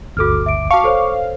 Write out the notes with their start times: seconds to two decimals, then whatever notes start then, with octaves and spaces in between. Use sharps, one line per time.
0.17 G1 D2 F#4 A4 D6 F6
0.46 E5 D7
0.71 F#4 F5 A5 C#6 D6 C#7
0.84 A4 C5 C#5